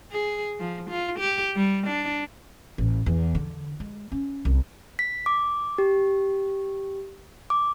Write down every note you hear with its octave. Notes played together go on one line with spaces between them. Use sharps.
G#4
F3
F4
G4
G3
D4
A1
E2
D3
G#3
C#4
C2
B6
D6
G4
D6